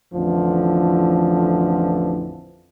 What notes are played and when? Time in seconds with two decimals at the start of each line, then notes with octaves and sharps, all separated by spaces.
0.14 A1 F2 D3 E3 F3